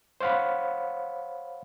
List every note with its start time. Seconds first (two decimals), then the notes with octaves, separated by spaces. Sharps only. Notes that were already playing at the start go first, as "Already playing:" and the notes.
0.21 C5 C#5 F5 F#5 B5